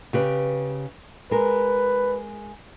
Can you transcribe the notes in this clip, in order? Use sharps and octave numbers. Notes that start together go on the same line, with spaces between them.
C#3 G4 B4
G#3 A#4 B4